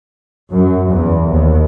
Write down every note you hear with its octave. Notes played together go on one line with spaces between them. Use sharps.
F#2
E2
D#2